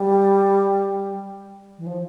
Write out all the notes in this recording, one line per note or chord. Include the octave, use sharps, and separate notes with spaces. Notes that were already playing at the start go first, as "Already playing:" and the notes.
Already playing: G3
E3
F3